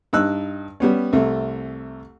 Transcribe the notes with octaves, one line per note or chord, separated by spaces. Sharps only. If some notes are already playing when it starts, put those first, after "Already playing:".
G2 D#4 E6 F#6
G3 B3 C#4
C2 C3 A3